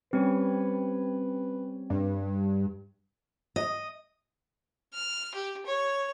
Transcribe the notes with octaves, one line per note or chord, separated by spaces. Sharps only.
G3 C4 C#4 B4
G2
D#5
F6
G4
C#5